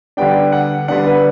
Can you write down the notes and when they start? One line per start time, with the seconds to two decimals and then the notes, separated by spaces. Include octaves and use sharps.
0.17 D3 G3 B3 D4 G5
0.52 F#5
0.88 D3 G3 B3 D4 F#5
1.07 B4